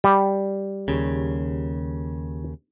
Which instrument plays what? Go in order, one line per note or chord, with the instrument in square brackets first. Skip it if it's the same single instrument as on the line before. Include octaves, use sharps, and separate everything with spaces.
[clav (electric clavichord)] G3
[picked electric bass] D#2 C#3